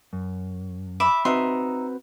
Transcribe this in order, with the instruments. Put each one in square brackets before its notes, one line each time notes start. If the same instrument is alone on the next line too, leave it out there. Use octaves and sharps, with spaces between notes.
[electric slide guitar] F#2
[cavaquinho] E5 B5 D6
[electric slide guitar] C4 F#4 B4 [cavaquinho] D#4 E5 C6